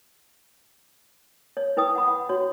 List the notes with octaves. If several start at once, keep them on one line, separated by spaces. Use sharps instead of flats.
C#5
E4 B4 G5 D#6
F#5 B5
F#5
F#4 C#5